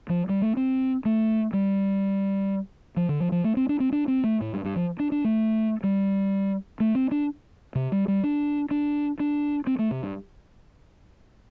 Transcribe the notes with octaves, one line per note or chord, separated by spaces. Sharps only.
F3
G3
A3
C4
A3
G3
F3
D3
F3
F3
A3
C4
D4
C4
D4
C4
A3
A2
G2
G2
F3
D4
D4
A3
G3
A3
C4
D4
C3
G3
G3
D4
D4
D4
C4
A3
C3
G2